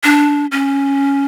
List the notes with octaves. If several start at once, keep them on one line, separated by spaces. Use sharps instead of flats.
D4
C#4